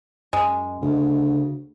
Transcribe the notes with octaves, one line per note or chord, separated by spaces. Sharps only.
F#2 G#3
D2 C#3